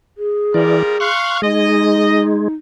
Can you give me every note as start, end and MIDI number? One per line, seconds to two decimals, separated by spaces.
0.18 1.05 68
0.54 0.83 52
0.54 0.95 55
0.54 0.95 65
0.54 0.95 70
0.54 0.83 74
1.00 1.40 77
1.00 1.38 84
1.00 1.40 85
1.00 1.38 90
1.42 2.48 56
1.42 2.54 63
1.42 2.25 75